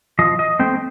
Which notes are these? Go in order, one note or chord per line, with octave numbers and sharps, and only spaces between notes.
F3 D#5
D#5
A3 C4 G5